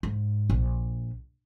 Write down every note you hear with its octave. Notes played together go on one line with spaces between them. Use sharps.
G#2
A#1